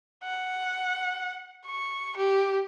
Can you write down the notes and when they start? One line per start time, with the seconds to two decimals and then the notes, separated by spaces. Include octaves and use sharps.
0.24 F#5
1.66 C#6
2.17 G4